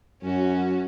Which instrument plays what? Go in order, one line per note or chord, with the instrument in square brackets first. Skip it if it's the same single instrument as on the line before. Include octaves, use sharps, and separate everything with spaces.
[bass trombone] F#2 [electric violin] C#4 F#4